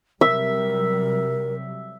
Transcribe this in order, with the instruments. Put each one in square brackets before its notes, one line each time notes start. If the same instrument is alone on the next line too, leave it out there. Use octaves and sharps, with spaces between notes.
[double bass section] C3 F#3 G3 [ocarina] A#4 [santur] E5